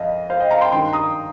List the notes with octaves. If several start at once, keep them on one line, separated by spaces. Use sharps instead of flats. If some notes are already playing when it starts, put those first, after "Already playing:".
Already playing: F2 D#5 F5
C5 F5
D#5 G5
F5 A#5
G5 C6
G2 D#3 G5 C6
A#5 D#6